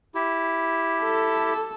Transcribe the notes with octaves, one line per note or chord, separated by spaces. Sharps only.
E4 G4
A4